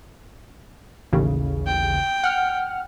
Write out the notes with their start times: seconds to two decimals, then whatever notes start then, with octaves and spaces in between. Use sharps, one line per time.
1.13 A1 D#2 C#3
1.66 G5
2.24 F#5 F6